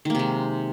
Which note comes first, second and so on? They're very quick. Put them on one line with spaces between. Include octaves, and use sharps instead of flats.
D#3 A#3 C3 G#3